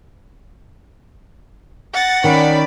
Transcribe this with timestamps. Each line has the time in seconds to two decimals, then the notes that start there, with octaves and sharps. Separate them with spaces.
1.94 F#5 A6 A#6
2.24 D#3 C#4 D5 B5